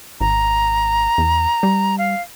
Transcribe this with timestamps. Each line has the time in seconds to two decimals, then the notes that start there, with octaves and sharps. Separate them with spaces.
0.21 G#1 A#5
1.18 E2
1.63 G3
1.98 F5